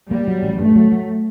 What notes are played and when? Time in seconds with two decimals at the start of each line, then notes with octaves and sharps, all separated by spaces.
0.11 G3 A#3
0.28 F#3
0.43 A1
0.59 G2 A3
0.76 F#3
0.92 F#3